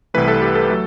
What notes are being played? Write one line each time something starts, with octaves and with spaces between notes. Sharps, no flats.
C2 C3 E3 A3 B4
A4
G4
A4
F#3 A3